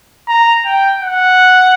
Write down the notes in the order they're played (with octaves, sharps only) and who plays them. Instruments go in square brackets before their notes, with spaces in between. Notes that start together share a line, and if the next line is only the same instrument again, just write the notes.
[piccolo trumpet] A#5
G5
F#5